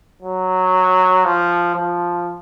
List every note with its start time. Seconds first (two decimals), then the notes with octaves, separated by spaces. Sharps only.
0.22 F#3
1.25 F3
1.75 F3